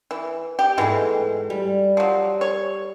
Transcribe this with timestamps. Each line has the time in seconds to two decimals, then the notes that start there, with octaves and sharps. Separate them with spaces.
0.11 E3
0.59 G4
0.78 G#2 B2 E3 G#3 A3
1.50 G3
1.97 F3 F#3
2.41 C#5